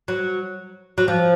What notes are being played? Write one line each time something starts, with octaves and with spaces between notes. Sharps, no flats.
F#3
F#3
F3